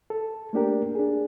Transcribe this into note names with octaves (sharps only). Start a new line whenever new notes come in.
A4
A3 A#3 D4 G4 A#4
D4 G#4